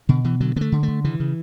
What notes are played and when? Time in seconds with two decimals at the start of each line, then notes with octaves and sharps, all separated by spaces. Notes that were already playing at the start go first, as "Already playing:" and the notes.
0.09 B2 D3
0.24 B2 E3
0.40 D3 F#3
0.56 D3 B3
0.61 A3
0.72 D3
0.83 D3 A3
1.04 C#3 E3
1.20 C#3